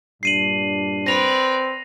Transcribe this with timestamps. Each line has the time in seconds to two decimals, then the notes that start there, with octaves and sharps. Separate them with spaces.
0.23 G2 A#2 D4 C7 D#7 F#7
1.07 C4 B4 D5 A#6 F7